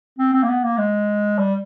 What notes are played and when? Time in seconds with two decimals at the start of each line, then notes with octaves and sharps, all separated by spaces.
0.19 C4
0.34 C4
0.43 A#3
0.49 B3
0.64 A#3
0.78 G#3
1.39 G3